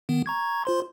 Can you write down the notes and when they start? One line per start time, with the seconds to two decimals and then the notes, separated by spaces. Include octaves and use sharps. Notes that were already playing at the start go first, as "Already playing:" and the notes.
0.09 D#3 B3
0.26 A#5 C#6 G#6
0.65 F4 C5 C6